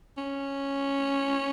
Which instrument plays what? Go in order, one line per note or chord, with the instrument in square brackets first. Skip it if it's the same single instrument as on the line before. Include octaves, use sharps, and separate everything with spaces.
[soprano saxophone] C#4